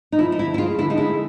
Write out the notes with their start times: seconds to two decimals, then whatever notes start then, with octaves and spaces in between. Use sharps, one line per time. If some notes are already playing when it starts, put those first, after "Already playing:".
0.12 D#4
0.18 F3 E4
0.32 D#4
0.38 D3 E4
0.54 E4
0.58 G#3 F4
0.79 D3 E4
0.90 D#4
0.98 G#3 E4